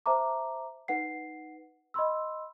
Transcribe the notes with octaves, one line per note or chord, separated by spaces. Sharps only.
C5 E5 A5 A#5 D6
D#4 B4 F#5 C7
D#5 B5 C6 E6